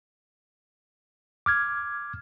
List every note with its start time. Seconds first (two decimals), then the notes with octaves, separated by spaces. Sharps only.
1.46 D6 F6 G#6